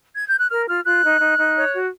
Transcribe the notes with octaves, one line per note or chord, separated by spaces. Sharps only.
G#6
G6
F#6
A#4 F6
F4 F6
F4 F#6
D#4
D#4
D#4
C#5
F#4